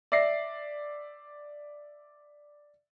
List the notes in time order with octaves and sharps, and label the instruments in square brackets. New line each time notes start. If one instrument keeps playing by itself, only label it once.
[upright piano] D5 E5 A#6 C7